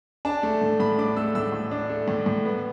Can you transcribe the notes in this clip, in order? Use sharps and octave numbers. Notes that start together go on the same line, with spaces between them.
D4 A5
A3
A2
A2 B5
D4 D6
A3 E6
A2 E6
A2
D4
A3
A2
A2
B3